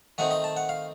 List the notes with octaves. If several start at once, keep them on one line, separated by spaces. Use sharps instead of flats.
D#3 A3 C4 D#4 F#5
D#5
A5
F#5
F5